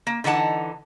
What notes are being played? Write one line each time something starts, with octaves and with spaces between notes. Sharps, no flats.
A#3
D3 E3 D#4 F#5 A5